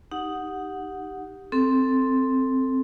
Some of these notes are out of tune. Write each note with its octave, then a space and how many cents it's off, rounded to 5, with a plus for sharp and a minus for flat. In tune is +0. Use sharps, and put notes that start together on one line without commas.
D#4 +0 G4 +0 F#5 -5
C4 +0 A4 +0